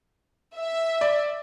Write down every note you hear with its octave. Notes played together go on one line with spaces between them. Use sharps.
E5
D5